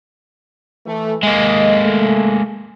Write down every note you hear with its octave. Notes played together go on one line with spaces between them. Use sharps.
E3 A3
G#3 A#3 D#5
A3